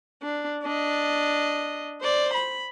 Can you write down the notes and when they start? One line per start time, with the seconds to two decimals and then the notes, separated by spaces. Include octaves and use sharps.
0.23 D4
0.63 D4 D#5
2.01 C5 D5
2.34 B5